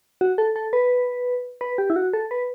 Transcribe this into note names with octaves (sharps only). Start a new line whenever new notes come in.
F#4
A4
A4
B4
B4
G4
E4
F#4
A4
B4